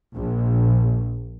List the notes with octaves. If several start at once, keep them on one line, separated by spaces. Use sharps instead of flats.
A#1